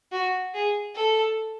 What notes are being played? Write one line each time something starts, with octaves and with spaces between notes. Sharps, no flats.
F#4
G#4
A4